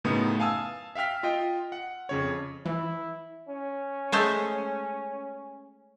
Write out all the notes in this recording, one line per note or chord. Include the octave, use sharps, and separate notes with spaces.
F#2 A2 C#3 A3 B3 D#4
F5 G#5 A5 D#6 E6
E5 F5 G5 F6 B6
F4 D#5 G5
F#5
F2 C#3 C#5
E3 E4
C#4
G#3 A3 C5